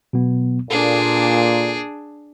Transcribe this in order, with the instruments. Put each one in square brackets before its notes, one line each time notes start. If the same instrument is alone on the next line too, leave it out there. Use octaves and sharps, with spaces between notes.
[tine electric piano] B2 F#3 B3
[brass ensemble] A#2 [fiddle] D4 G#4 [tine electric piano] A4